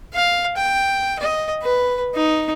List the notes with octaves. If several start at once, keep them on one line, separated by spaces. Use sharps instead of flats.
F5
G5
D#5
B4
D#4